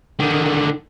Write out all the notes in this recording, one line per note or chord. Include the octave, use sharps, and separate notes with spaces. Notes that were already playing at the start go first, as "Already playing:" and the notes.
D3 D#3